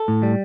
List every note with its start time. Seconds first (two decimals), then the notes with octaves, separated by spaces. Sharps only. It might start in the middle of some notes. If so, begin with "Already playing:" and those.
Already playing: A4
0.08 A2
0.23 G3